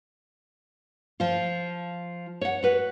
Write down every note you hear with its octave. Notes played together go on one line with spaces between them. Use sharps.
F3 F4
C#5 F#5
F#4 B4